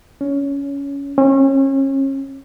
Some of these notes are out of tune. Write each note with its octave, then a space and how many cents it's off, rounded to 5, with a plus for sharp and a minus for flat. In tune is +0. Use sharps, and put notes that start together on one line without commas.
C#4 +15
C#4 -35